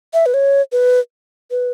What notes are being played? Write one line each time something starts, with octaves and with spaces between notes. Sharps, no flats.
E5
B4
C#5
B4
B4